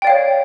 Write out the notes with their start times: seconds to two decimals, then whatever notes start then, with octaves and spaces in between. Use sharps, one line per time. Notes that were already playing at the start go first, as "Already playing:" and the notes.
0.02 G5
0.05 D5
0.07 F5
0.10 C#5